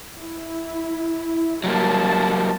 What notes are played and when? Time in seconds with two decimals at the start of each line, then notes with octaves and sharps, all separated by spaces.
0.19 E4
1.64 F#3 G3 A#3 A5